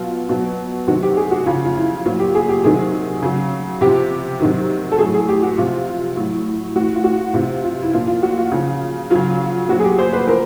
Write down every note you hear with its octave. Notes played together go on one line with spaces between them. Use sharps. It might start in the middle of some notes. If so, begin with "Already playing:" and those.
Already playing: B2 F#3 F4
B2 F#3
C3 D#3 F#3 F#4
G4
G#4
F#4
C#3 F3 F4
F4
E4
A#2 F#3 F4
G4
G#4
G4
C3 D#3 F#3 G#4
C#3 F#3
C3 F3 G4
C3 D#3 F#3
A4
A2 F#3 G#4
G#4
G4
F#4
C3 F3 F4
A2 F#3
A2 E3 F#4
F4
F#4
C3 E3 F4
F4
E4
A#2 F3 F4
F4
F#4
F4
C#3 F3
C#3 F#3 F4
A#2 F#3 F#4
G#4
G4
C5
B4
F3 A#4